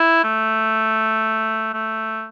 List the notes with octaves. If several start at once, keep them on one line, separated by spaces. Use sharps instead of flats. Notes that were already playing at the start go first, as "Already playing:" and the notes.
Already playing: E4
A3
A3